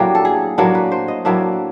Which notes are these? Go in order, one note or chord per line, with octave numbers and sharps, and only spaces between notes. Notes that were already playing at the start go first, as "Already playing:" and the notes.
Already playing: A2 F#3 A#3 D4 G4
A4
G#4
A2 F#3 A#3 D4
B4
C5
D#5
A2 F#3 A#3 D4 E5